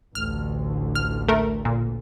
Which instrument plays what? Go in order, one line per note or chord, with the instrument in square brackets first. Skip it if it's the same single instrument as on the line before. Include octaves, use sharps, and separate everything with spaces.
[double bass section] A1 D2 D3 [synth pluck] F6
[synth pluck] F6
A3 A#4
A#2